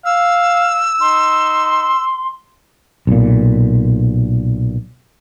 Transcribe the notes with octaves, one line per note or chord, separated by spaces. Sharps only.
F5 E6
D#4 C6
B1 A#2